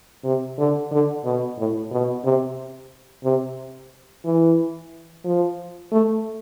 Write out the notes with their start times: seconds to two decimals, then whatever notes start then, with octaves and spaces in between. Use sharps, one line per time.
0.24 C3
0.58 D3
0.91 D3
1.24 B2
1.58 A2
1.91 B2
2.24 C3
3.24 C3
4.25 E3
5.25 F3
5.92 A3